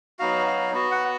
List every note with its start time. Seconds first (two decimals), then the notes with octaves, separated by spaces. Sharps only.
0.19 F#3 B3 D#4 F#4 F5
0.47 F5
0.73 B3 F#4
0.92 F#5